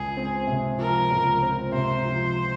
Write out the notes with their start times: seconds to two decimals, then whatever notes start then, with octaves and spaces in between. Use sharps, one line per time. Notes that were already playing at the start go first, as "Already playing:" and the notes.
Already playing: C#2 G#4
0.17 C4
0.47 C3
0.78 F3 A#4
1.11 C#2
1.42 C4
1.72 C3 C5
2.05 F3